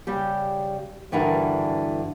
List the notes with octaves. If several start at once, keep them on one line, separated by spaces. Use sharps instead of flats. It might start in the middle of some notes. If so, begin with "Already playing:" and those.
C#3 G3 G4
G2 D3 E3 D4 F#4 A#4